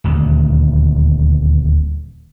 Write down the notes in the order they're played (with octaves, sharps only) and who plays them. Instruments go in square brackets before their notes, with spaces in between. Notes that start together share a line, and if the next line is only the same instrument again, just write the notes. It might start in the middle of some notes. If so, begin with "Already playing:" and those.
[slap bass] D#1 D2